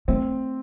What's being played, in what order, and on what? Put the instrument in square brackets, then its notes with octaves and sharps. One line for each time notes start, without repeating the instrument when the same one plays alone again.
[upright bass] A3 [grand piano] C4